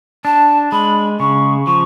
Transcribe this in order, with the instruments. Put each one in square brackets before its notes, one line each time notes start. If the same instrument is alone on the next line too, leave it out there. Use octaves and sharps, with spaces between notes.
[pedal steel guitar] D4 [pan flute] A5
[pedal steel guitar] G#3 [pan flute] B5
[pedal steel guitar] C#3 [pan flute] C#6
[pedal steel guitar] F3 [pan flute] C#6